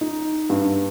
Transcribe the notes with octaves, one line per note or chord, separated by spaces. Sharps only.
D#4
G2